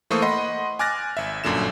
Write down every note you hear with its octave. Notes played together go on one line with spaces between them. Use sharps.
E3 A3 A#3 C5 C#6 D#6
D#5 F#5 B5 C6
G#5 D6 F6 F#6 A6 A#6
G#1 E5
G1 F#2 A#2 D3 E7